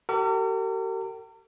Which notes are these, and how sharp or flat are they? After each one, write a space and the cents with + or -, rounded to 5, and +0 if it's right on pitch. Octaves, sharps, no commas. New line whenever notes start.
G4 -40 A#4 -45